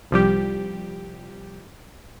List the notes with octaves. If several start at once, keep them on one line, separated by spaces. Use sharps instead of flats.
C2 F3 G3 G4